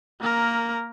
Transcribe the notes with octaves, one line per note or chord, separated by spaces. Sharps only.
A#3 A#4